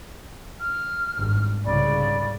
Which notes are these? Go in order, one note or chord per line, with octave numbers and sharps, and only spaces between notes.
F6
G#1 G2
C2 G#2 C#3 D5 B5